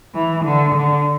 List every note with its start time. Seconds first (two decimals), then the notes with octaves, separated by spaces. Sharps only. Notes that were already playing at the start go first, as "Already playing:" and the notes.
0.15 E3
0.45 D3
0.75 D3